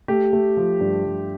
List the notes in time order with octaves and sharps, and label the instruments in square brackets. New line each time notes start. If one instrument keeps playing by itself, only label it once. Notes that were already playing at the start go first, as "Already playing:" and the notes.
[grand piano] A3 G4
A3
F3
G2
G2